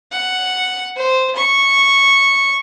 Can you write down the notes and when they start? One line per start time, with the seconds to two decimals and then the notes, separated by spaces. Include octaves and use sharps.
0.12 F#5
0.96 C5
1.36 C#6